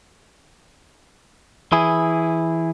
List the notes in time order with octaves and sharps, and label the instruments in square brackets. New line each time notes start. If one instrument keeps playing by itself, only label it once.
[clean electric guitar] E3 E4 G#4